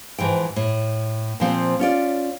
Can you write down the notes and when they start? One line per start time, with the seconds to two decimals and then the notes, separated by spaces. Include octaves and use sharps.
0.18 G#2 E3 F3 G5
0.56 A2
1.40 A#2 F3 C4
1.79 C#4 F4 D5